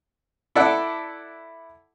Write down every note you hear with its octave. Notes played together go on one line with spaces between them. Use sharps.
E4 A4 D5 F#5